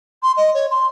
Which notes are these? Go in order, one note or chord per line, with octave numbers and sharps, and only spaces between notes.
C6
D#5
C#5
C6